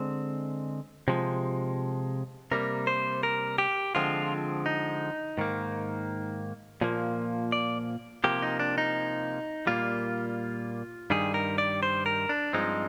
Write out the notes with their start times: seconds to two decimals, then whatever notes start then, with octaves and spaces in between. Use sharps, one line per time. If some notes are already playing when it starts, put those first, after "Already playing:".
Already playing: D3 G#3 C4
1.08 C3 F3 G#3
2.51 C3 G3 A#3 A#4
2.87 C5
3.23 A#4
3.58 G4
3.95 D3 F3 G#3 C4 F4
4.66 D#4
5.38 G#2 D#3 A#3
6.81 A#2 F3 A#3
7.52 D5
8.24 C3 F3 A#3 G4
8.43 D#4
8.60 D4
8.78 D#4
9.67 A#2 G3 A#3 F4
11.10 G2 D#3 G3 G#4
11.34 A#4
11.58 D5
11.83 C5
12.06 A#4
12.29 D4
12.53 G2 F3 G#3 C4 D#4